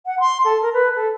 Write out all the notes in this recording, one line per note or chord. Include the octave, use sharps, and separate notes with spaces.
F#5
C6
A4
A#4
B4
A4